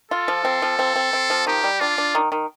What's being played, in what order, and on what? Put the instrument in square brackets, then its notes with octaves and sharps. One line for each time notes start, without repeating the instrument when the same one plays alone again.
[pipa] F4 [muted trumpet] A4
[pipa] F3
C4
F3
C4
C4
C4
F3
[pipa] D#3 [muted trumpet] G4
[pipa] G3
[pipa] D4 [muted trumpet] F4
[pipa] D4
D#3
D#3